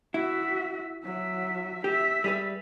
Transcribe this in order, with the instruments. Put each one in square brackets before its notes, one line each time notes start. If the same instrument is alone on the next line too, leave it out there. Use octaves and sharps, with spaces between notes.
[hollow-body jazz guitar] E4 [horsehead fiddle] F#4 E5
[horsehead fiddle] F#3 E5
[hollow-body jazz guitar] G4 [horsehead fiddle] E5
[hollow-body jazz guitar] G3 G#4 B4